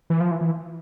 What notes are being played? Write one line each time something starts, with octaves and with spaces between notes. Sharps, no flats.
E3
F3
E3
E3